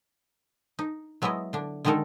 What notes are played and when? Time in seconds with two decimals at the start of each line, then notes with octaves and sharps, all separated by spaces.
0.79 D#4
1.22 F#3 G#3 B3 E4 D#5
1.53 D3 D4
1.85 D3 D#3 G#3 D#4 A4 A#4